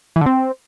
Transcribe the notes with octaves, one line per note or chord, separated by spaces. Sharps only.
E3
D3
C4